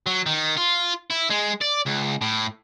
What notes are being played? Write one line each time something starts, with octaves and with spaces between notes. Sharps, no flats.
F#3
D#3
F4
E4
G#3
D5
C#2
A2